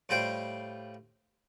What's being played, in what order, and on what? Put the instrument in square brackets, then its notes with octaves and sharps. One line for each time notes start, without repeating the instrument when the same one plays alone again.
[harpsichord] A2 G3 F4 C5 G5